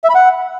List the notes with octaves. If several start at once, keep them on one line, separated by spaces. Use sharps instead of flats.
E5
B5
F#5